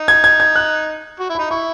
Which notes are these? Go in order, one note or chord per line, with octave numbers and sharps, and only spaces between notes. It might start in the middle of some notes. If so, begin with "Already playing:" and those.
Already playing: D#4
G#6
G#6
G#6
F#6
F#4
E4
D#4 B5
E4 C#6